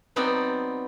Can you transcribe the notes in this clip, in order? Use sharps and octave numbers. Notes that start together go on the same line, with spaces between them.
F#3 B3 C4 D#4 D5 G5